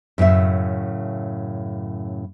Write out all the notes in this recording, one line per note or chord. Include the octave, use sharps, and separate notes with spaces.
F#2 A2 C#3 E5